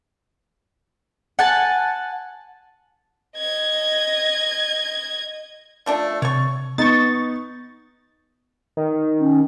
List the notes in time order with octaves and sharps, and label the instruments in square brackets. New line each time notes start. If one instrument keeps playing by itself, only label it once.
[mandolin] F#5 G#5 A5
[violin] D#5 G#6
[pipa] F3 A3 D4
[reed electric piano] C3 A6 [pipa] C#5 C#6
[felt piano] B3 D#4 [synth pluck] C#6 A6
[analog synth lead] D#3
[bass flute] C#4